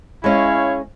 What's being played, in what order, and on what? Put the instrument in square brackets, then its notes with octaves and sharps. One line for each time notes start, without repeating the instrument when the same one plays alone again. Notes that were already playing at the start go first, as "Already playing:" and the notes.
[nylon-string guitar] G#3 C#4 [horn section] E4 C#5 F5